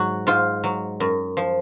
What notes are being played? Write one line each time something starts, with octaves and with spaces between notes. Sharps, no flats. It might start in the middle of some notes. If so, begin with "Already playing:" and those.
Already playing: G#2 F#3 F#4
G#2 F4
F#3
F#2
F3